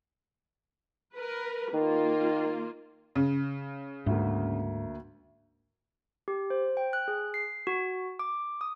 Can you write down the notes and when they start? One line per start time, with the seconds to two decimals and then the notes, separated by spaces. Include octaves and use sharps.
1.15 A#4 B4
1.74 D#3 A#3 F4
3.15 C#3
4.06 D2 G#2 A#3
6.28 G4
6.50 C5
6.77 G5
6.93 F#6
7.08 G#4
7.34 C7
7.67 F#4
8.19 D6
8.61 D#6